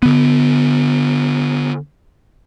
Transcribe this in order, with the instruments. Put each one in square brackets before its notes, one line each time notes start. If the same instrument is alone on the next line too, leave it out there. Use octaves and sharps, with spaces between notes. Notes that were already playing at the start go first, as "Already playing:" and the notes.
[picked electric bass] D3 B3